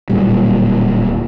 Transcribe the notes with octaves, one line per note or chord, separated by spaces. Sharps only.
D1 A#2 G3